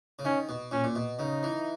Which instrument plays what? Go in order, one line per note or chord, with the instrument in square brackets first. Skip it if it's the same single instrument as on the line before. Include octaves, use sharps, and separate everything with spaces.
[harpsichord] C#3
[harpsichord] D#3 [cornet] C#4
[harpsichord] B2
[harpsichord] A#2 [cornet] C#4
[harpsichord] A#2
B2
[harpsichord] C#3 [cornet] D#4
[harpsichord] E3